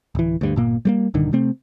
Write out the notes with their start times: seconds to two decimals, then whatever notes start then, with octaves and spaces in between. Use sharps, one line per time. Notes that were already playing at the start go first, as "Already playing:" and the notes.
0.15 D1 E3
0.41 D2 G2
0.56 G1 A#2 A#3
0.85 G3 G#3 A#3
1.14 A#1 G2 D3 D#3
1.33 C3 A3 C4